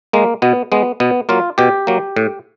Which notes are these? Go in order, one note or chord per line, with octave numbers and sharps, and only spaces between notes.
G#3 A#3
B2 B3
G#3 B3
B2 B3
F#3 A#3 F4
B2 G4
F#3 A#3
A2